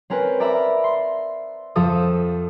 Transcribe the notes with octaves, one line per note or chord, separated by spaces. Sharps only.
C4 C#4 A#4 B4
D5 E5 A#5 B5 E6
C6
F2 F3 A4 D#6